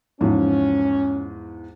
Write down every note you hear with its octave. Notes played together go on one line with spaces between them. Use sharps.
E2 G#2 F3 C#4